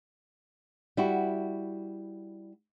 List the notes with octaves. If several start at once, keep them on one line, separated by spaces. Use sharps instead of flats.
G3 E4 F#4